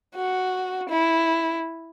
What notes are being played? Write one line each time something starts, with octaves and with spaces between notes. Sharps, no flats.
F#4
E4